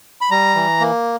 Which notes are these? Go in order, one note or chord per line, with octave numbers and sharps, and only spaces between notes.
B5
G3 A#5
E3
A#3